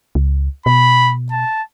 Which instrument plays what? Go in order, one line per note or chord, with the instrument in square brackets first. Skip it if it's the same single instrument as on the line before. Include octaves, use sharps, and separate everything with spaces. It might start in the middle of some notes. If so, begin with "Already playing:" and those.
[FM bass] C#2
[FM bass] B2 [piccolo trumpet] B5
[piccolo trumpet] A5